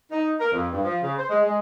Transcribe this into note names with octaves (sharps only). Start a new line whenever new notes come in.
D#4
A#4
F2
G2
F3
C#3
C5
G#3
G#3